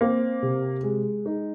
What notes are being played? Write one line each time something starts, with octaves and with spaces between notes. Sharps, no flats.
A#3 C4
C3
G#3
D#4